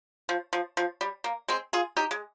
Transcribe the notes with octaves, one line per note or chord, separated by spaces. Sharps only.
F3
F3
F3
G3
A#3
G#3 C4
F4 G#4
D#4 G4
G#3